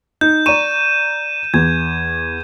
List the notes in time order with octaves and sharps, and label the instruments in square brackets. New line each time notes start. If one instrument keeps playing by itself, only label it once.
[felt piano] D#4 [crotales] G6
[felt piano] D5 A#5 C#6 [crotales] D#7 E7
[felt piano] E2 [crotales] G#6